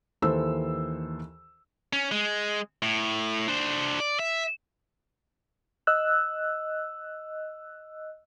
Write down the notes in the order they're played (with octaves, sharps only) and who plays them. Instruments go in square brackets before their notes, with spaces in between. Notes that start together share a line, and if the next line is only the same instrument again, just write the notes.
[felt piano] D#2 E3 A4 C5 E6
[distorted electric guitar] C#4
G#3
A2
D4 C5
D5
E5
[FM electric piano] D#5 E6 F#6